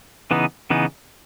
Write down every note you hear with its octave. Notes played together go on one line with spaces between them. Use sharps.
C#3 E3 B3 D#4
C#3 E3 B3 D#4